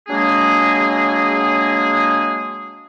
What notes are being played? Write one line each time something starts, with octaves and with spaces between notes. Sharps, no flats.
F#3 G#3 A#3 D4 G#4